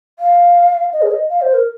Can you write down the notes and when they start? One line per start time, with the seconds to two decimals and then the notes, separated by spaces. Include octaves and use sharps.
0.19 F5
0.93 D#5
1.02 G#4
1.11 D#5
1.30 F5
1.42 C5
1.54 A#4